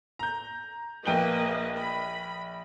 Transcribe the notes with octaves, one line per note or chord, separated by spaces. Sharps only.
A#5 G6
A#1 A#3 B4 D#5 G5 G7
B5